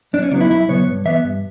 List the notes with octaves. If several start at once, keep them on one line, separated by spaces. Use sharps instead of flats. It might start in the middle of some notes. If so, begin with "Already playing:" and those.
F#2 D4
C#4
C#3 F#3 B3 D4
E4
F#2 E4
C#3 F#3 B3 C#5
G2
E3 B3 E5
G2